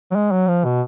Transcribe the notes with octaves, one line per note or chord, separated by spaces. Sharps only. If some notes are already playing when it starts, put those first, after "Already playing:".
F#3
G#3
F#3
F3
B2